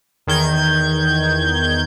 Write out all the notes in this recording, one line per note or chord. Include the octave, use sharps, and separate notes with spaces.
E2 D#3 G6 G#6